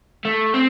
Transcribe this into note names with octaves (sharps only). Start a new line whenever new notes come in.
A3
C4